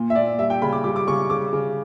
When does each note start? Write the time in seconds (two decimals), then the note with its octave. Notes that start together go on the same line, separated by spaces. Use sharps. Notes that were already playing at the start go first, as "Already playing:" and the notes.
Already playing: A#2
0.10 E5
0.15 A#2 D5
0.39 G3 E5
0.50 G5
0.62 C#3 B5
0.73 D6
0.84 G3 D6
0.96 D6
1.07 C#3 C#6
1.30 C#3 D6
1.53 C#3